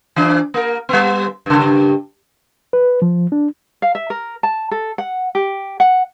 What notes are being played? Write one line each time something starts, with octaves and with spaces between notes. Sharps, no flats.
E3 D4
A#3 A#4
G3 B3
G2 C#3
B4
F3
D4
F5
E5
A#4
A5
A4
F#5
G4
F#5